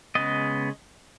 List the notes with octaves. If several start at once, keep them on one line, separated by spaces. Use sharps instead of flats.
C#3 G#3 B3 D#5